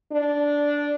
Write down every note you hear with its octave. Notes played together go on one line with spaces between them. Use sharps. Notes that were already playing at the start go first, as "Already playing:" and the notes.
D4